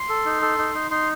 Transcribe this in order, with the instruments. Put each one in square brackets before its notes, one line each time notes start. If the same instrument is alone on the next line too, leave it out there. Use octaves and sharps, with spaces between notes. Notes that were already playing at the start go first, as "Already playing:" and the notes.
Already playing: [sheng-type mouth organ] C6
A4
D#4
A4
D#4
D#4
D#4 C6